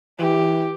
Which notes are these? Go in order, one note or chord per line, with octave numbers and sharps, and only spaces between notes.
E3 G4